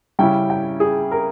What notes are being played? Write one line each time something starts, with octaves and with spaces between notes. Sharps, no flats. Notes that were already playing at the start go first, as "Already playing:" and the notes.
C#3 G3 C#4 E4 G5
G5
G#4
A#4